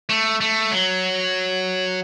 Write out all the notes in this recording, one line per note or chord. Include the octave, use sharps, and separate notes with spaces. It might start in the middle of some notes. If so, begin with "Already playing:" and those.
A3
A3
F#3